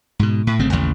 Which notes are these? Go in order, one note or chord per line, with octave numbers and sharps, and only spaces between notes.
G#2 B2
A2
G1 C#3 A3 C4
A1 D#2 C#3